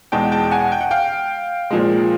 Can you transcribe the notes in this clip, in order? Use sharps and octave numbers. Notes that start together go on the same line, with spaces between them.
E2 B2 G#3 G5 A5
G5 A5
F#5 G#5
G5
F#5
F5 G5
A#2 F3 G#3